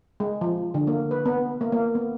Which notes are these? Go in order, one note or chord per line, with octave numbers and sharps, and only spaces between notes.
G#3
F3
D3
A#3
B4
B3
A#3
A#3
B3